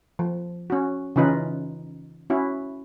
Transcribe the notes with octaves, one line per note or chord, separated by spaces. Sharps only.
F3
C#4 F#4
C#3 E3 C#4 D#4 F4 B4
C#4 E4 F#4